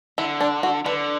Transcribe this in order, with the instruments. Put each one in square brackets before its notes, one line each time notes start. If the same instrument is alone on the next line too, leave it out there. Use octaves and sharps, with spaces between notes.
[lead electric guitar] D3 [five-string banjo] E4
[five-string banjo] D4
F#4
[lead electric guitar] D3 [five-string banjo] B4